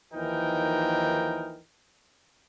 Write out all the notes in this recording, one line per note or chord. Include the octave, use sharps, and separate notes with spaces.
D#2 E3 F3 D#4 A#4 G5